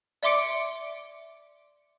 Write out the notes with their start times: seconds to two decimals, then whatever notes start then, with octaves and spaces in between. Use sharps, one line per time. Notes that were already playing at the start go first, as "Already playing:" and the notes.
0.23 D5 E5 C6 D6 C#7 D7